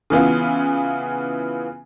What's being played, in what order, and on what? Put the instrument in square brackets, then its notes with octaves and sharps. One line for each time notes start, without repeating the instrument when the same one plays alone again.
[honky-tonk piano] C#3 E3 B3 F4